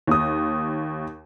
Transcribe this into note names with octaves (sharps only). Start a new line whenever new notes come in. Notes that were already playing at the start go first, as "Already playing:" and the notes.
D#2 D#6